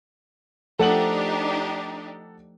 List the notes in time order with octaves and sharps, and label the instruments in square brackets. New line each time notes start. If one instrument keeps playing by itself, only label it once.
[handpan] F3 A3 [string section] D4 D#4 G4 [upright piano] A4 F#5 F#7